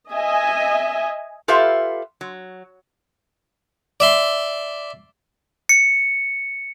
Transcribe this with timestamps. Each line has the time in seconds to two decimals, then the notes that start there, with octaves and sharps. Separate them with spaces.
0.12 D#5 E5 G#5
1.48 F4 G4 A4 B4 E5 F5
2.21 F#3
4.00 D5 E5 C6
5.69 C#7